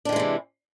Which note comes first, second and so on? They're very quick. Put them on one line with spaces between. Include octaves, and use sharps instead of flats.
D4 D#3 G#3 E3 C3